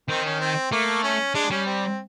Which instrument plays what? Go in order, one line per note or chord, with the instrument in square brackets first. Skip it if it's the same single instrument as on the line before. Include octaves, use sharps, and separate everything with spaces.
[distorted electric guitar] D#3 [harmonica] C4
[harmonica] C#4
C4
[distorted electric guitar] A3 [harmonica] A#3
[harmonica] C#4
[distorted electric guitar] G#3 [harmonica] D4
[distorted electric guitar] G3 [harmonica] C#4
[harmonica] C4